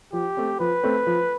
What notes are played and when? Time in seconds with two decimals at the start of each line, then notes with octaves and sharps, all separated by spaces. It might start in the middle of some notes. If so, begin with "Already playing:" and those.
0.13 F3 G4
0.37 A3 C4
0.60 F3 B4
0.83 A3 C4
1.07 F3